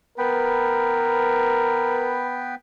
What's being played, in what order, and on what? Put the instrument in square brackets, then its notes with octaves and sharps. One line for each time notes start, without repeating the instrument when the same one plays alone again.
[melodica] B3 B4 G5 [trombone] A#4